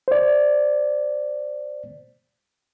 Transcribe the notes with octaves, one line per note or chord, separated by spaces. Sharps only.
C5 D5